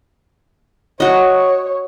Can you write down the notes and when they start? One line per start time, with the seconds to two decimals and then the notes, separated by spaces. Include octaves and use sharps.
1.00 F#4 C#5 D#5